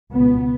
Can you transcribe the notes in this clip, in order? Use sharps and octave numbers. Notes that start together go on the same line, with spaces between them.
C#2 B2 B3